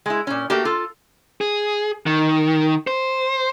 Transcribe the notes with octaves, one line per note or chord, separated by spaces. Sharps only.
G#3 E4
A#2 C#4
A3 A#3 F#4 G4
F4 A4
G#4
D#3
C5